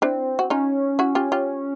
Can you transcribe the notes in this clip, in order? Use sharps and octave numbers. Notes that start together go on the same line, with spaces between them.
C4 D4 E4
F#4
C#4 D#4 F4
E4 F#4
F4 G4
F4 G4